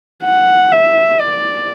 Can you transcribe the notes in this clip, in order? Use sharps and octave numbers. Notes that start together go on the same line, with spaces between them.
F#5
E5
D5